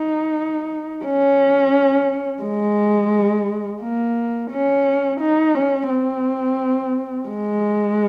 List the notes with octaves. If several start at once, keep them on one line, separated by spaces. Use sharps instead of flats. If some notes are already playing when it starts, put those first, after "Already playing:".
Already playing: D#4
C#4
G#3
A#3
C#4
D#4
C#4
C4
G#3